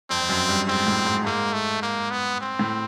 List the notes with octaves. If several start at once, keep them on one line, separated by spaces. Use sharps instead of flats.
F2 C4
F2
F#2
G2
G#2 C4
A2
G#2
G#2 A#3
A3
A#3
B3
C4
A2